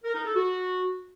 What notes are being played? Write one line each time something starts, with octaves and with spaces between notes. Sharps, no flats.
A#4
D#4
A4
F#4